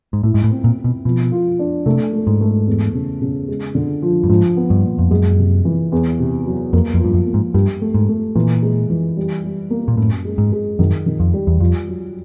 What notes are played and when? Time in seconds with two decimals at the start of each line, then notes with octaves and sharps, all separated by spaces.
0.13 G#2
0.23 A2 E4
0.34 G#2
0.44 A2
0.51 C4
0.64 A#2
0.77 C4
0.84 B2
1.05 B2 F3
1.32 F4
1.59 D4
1.86 C3 A3
2.13 A3
2.27 G#2
2.41 A3
2.67 E2
2.94 C#3
3.22 C#3
3.48 G#3
3.75 D3
4.02 F3
4.24 G2
4.29 G#2 F3
4.56 B3
4.70 G2
4.83 A#2
4.98 F2
5.11 F#2 G#3
5.38 C3
5.65 E3
5.92 E2
6.19 C3
6.46 F#3
6.73 F2 A#3
6.94 F2
7.00 G2 F3
7.14 F#2
7.27 A#3
7.34 G#2
7.54 G2 G4
7.82 A3
7.94 G#2
8.09 A3
8.35 A#2 E3
8.62 G#3
8.90 E3
9.17 G3
9.44 G3
9.70 A#3
9.88 A#2
9.97 F#2 A2
10.25 G#3
10.38 G#2
10.52 G#3
10.79 F#2 D#3
11.06 D#3
11.20 F2
11.34 G3
11.47 E2
11.60 F2 F4
11.88 F#3